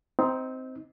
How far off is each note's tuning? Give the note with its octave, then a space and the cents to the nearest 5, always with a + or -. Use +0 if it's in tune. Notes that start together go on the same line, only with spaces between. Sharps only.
C4 -10 D#4 +20